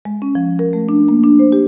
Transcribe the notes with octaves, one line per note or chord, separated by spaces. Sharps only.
G#3
C#4
F3
A#4
A3
D4
A#3
D4
C5
G4